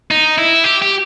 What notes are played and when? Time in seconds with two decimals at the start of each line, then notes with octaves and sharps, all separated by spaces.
0.11 D#4
0.38 E4
0.64 G4
0.82 G4